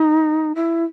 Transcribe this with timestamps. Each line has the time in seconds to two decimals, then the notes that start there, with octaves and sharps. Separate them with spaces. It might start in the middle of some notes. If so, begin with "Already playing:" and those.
Already playing: D#4
0.55 E4